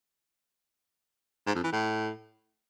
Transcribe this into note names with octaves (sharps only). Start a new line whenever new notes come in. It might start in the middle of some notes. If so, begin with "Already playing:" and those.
G#2
F2
E3
A2